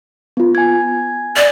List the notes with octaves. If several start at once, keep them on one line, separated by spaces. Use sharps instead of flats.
B3 F4
G#5 G#6
D5